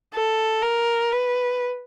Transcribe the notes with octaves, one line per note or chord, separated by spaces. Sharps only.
A4
A#4
B4